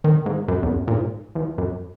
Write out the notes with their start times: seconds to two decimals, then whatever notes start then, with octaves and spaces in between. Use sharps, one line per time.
0.04 D#3
0.26 G#2
0.48 F#2
0.63 E2
0.70 F#2
0.88 A#2
0.92 G#2
1.35 E2
1.58 F#2